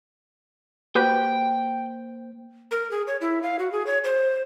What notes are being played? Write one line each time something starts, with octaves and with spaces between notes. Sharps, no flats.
A#3 F#4 G4 B4 C5 G5 G6
A#4
G#4
C#5
E4
F5
F#4
G#4
C#5
C5